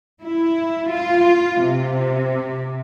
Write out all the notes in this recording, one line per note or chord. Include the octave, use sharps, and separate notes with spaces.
E4
F4
C3